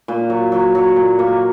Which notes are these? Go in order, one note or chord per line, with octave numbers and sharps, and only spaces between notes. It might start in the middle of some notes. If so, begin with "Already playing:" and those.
A#2
F#3
F#3
F#3
A#2
A#3